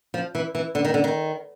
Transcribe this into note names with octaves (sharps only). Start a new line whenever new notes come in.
F3
E3
E3
D3
D#3
D3
D#3